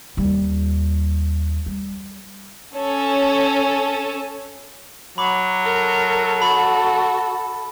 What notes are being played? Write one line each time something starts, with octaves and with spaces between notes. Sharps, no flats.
D#2 G3
G3
C#4 A4
F#3 B5 D6
A4 A#4
F#4 B5